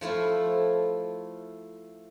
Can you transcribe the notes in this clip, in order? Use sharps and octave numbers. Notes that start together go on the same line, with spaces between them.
F3 A3 E4 F4